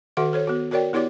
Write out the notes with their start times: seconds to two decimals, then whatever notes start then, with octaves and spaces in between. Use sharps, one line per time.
0.17 D#3 F#4 A4 E5 F#5
0.33 A4 C5 C#5
0.47 B3 F#4
0.71 F#4 A#4 C#5 D5 G5
0.93 B3 E4 G4 C#5 D5 D6